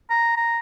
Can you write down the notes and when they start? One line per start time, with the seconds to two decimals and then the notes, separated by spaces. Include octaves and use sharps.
0.10 A#5
0.36 A#5